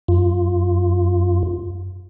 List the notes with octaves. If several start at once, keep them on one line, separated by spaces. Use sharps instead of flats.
F#2 F4